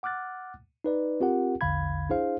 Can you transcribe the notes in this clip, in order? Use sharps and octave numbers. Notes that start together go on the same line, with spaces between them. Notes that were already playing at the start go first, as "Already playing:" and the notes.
F#5 D6 F6 F#6 A6
D#4 B4 D5
C4 F4 G4 A#4 F#5
A#1 E2 D3 F5 B5 G#6
D4 E4 G#4 C5 F5